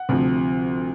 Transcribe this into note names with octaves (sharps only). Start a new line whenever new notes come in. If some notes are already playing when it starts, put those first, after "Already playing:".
Already playing: F#5
D2 C3 F3